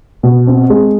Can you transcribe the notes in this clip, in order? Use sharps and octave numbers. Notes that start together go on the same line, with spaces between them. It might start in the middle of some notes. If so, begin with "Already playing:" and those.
B2
C4
G#3